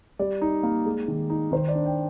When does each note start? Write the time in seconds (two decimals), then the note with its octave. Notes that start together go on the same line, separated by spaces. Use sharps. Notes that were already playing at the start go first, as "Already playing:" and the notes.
0.19 G3 D5
0.42 D#4
0.63 A#3
0.86 G#3
1.08 D#3
1.30 D#4
1.52 D#3 C5
1.68 D5
1.75 D4
1.86 G5